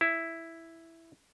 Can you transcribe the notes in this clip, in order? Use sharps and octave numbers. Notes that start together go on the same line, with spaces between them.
E4